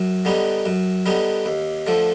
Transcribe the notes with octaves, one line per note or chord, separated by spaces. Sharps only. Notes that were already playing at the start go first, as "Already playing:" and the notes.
Already playing: F#2
D3 G3 B3 D#4
F#2
D3 G3 B3 D#4
D#2
D3 F3 A3